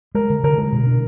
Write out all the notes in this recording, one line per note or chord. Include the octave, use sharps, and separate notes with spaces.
G#3 A#4
D3
D3 A#4
G#3 A#4
B2
D4